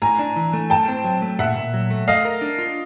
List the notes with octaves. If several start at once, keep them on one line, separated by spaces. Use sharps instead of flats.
A2 G#5 A#5
D4
E3
A3
A2 G5 A5
C4
F#3
A3
A#2 E5 F#5
A#2
F#3
A3
A3 D#5 F5
A#4
D4
F4